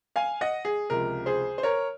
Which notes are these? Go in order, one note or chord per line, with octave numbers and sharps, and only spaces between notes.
F5 G#5
D#5 F#5
G#4
C#2 C3 F3 A#4
G#4 C5
C5
A#4 C#5